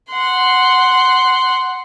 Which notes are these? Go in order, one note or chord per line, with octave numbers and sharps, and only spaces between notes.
F#5 C6